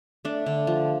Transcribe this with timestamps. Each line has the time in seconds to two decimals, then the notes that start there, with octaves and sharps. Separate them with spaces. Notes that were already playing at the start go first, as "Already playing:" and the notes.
0.25 A3 D4
0.46 D3
0.67 F3